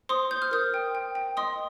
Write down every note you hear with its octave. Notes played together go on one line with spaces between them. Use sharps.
C5 C6 D#6
C5 G6
F6
A#4 D#6 G6
G5
G5
G5
D#5 C6 D#6